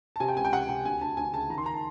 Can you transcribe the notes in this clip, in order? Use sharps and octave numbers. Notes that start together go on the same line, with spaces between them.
A5
C3 G#5
G5
C#2 G#5
G5
C3 F#5
C3 G5
D2 G#5
D2 A5
D2 G#5
C#3 A5
D#3 A#5
C6
A#5
A5